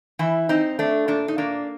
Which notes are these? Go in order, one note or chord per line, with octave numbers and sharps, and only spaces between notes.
E3 E4
C4 D#4
A3 D4
A#2 D4
D#4
A#3 D4